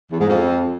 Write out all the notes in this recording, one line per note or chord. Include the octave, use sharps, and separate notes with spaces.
E2
G#2
F2